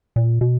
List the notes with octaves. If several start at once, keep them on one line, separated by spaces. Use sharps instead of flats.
A#2
B2